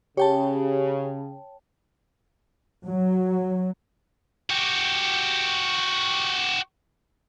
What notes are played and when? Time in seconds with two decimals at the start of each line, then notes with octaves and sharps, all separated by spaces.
0.17 C#3 G4 C#5 G5 A5
2.86 F#3
4.50 F#4 G4